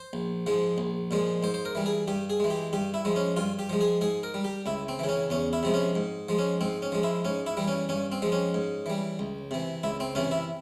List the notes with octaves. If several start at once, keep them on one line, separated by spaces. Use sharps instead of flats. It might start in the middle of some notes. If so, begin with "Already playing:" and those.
Already playing: C5
A#1
G#2 F3 G#3
A#1
A#2 F3 G#3
G#2 C5
C5
A#4
E3 G3
G#4
G2 G4
G#4
E3 G#3
G4
G2 G4
E4
F3 G#3
C#4
G2 F4
G4
F3 G#3
G#4
G#2 G#4
A#4
G3
G4
C#2 E4
C4
C#3 E3
C#4
E2 C#4
E4
C3 F3 G#3
C#4
G#2
F3 G#3
C#4
G#2 C4
C#4
F3 G#3
E4
G#2 C#4
E4
E3 G3
C#4
G2 C#4
C4
F3 G#3
C#4
G#2
E3 G3
C#2
C3 E3
C#2 E4
C4
C3 E3 C#4
E4